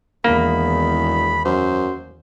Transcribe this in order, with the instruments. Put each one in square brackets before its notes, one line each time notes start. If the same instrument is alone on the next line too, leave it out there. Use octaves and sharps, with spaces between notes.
[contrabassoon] E1 [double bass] E2 D#3 [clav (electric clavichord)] A#3 [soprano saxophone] B5
[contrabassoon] F#2 [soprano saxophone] C5